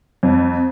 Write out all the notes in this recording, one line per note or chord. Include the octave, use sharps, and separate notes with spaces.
F2